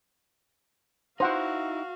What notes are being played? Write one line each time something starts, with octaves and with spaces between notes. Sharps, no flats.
D#4 E4 F#4 C5 F5 F#5